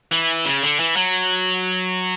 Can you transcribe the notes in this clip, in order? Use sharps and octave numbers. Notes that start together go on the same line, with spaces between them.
E3
C#3
D3
E3
F#3